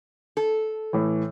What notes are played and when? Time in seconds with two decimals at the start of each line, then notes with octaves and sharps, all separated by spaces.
0.37 A4
0.93 A2 E3